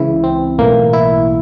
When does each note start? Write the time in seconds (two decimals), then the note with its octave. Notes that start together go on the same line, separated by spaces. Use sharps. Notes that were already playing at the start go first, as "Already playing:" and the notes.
Already playing: C#2 C#3 E3 E4
0.24 C4
0.59 B1 A2 E3 A#3
0.93 E4